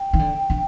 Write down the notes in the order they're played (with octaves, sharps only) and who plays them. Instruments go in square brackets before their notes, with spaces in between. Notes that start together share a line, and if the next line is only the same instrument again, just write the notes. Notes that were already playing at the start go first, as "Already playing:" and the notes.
Already playing: [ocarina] G5
[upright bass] D#3
D3
D3